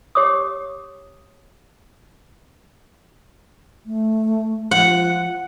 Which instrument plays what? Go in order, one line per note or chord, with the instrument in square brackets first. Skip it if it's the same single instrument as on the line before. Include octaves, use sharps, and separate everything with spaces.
[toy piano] G4 C#5 D6 D#6
[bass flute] A3
[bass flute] F3 [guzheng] F#5